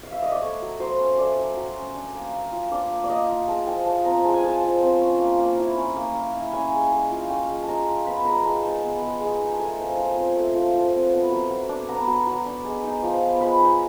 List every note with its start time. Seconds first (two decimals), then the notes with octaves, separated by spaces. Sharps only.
0.03 F5
0.12 E5
0.22 D#5
0.32 D5
0.42 A3 C#5
0.62 F#3
0.80 F#3 C5
0.99 C#4
1.18 A3 D5
1.38 F#3
1.57 F#3
1.76 C#4
1.95 D4
2.15 A#3
2.33 A#3
2.52 F4
2.71 D4 D5
2.91 A#3
3.04 D5
3.10 A#3 D#5
3.28 F4
3.48 G#3 A5
3.67 F3 G5
3.86 F3 A5
4.05 C4 A#5
4.24 G#3 A5
4.34 G#5
4.43 F3 A5
4.63 F3
4.82 C4
5.01 C#4
5.20 A#3
5.39 A#3
5.58 E4
5.77 C#4
5.96 A#3
6.15 A#3
6.34 E4
6.53 C#4 G#5
6.73 G#3
6.92 G#3
7.10 F4
7.30 C#4 G5
7.49 G#3
7.63 A5
7.68 G#3 A#5
7.87 F4
8.06 B3 B5
8.25 G#3 A#5
8.44 G#3 A5
8.64 D#4 A5
8.83 B3
9.02 G#3
9.21 G#3
9.40 D#4
9.53 A5
9.59 A3 G#5
9.78 F3
9.97 F3
10.16 C4
10.36 A3
10.55 F3
10.74 F3
10.93 C4
11.12 B3
11.31 F#3
11.50 F#3
11.69 D4
11.89 B3 A#5
12.07 F#3
12.27 F#3
12.46 D4
12.65 G#3
12.83 D#4
13.03 F3
13.22 B3
13.41 G#3 B5
13.61 D#4